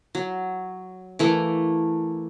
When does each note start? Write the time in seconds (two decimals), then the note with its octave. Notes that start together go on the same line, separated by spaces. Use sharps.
0.15 F#3
1.19 E3 A3 A#3